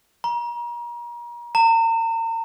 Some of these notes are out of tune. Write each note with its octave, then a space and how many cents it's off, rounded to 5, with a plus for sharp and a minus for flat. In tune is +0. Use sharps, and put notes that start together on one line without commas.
A#5 +35
A#5 -40